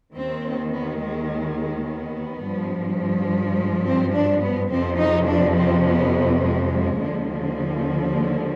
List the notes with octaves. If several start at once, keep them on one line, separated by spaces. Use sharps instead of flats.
D#2 D#3 C4
B3
G#3
G#3
G#3
B3
G2 F3
G#3
C4
D4
B3
F2 C3 F3 C4
D#4
D4
C4
B3
G#3
G#3
D#2 D3 F3
G#3